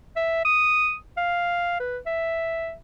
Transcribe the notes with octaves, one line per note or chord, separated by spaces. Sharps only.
E5
D#6
F5
B4
E5